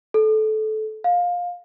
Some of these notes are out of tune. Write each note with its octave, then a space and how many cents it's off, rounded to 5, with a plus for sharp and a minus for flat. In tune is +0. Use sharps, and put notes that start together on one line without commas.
A4 -20
F5 +20